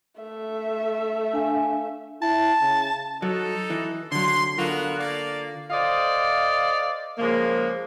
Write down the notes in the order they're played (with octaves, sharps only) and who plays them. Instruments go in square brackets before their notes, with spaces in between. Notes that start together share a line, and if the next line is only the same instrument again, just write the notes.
[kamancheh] A3 E5
[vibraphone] D4 F5 G#5
[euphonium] E4 [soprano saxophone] A5
[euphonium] C#3
[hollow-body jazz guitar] F#3 [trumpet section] D#4 A4
[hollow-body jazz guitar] E3
[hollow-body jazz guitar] D3 F#3 [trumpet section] C6
[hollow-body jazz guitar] D3 F4 [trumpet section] B3 F#4 A#4
[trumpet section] A#3 D5 F5
[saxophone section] A4 C5 D5 D#5 F5
C#3 F3 G#3 A#3